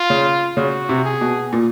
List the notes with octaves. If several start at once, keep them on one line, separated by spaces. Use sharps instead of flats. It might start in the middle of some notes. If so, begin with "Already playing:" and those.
Already playing: F4
C#3
C#3 F#4
C3
G#4
B2
A#2